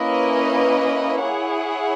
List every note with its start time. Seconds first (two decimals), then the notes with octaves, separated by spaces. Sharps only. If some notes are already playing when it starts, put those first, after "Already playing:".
Already playing: A#3 C#4 E4 B4 D#5
1.22 E4 G#4 C#5 F#5